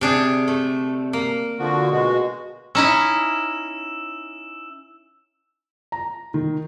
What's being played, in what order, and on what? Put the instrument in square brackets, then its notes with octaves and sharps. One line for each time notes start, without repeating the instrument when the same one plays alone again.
[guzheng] C3 D4 G#4
A3
A#3
[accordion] D3 F3 F#4
B2 G#3 F#4
[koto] C#4 D#4 E4 [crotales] E6 E7
[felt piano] A#5
D#3